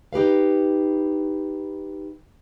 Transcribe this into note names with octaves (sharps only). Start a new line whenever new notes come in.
D#4 G4 B4 F5